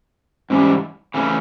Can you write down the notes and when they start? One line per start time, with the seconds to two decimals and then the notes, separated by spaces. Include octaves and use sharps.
0.50 G#2 E3 G3 C#4
1.14 C#3 E3 A3 C#4